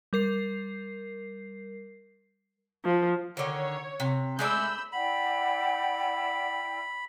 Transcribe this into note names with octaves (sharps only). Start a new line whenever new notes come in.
G3 A#4 C7
F3
D3 D#3 C#5
C3
G#3 A3 D5 B5 E6 G6
E4 D5 F#5 G5 B5